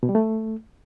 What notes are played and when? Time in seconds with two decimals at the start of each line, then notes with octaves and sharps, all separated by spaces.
0.03 B2
0.09 G3
0.15 A3